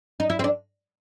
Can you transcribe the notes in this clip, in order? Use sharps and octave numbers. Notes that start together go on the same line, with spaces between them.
D#4
E4
C4
D4